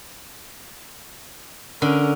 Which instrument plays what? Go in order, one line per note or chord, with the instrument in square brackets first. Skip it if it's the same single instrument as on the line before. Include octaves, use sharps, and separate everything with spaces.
[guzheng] D3 [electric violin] C#4 A#4